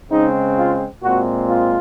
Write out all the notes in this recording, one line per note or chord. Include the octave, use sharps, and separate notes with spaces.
C#3 G#3 C4 D#4
F4
A#2 G#3 C4 F#4
F4